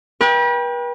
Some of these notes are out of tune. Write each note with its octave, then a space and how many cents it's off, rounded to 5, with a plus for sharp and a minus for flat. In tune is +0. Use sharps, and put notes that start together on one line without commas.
B4 -40 G5 +20